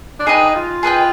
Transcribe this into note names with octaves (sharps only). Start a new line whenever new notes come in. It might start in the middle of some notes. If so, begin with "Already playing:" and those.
D4
D#4 G#4 B4 D#5 G5
F4
G#4 B4 D#5 G5